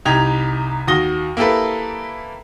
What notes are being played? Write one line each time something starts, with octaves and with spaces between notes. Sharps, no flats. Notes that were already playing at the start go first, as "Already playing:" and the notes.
C2 D#4 G4 G#6 F7
D#2 F#4 D#6 A#6 G7
A#3 E4 G4 A4 B4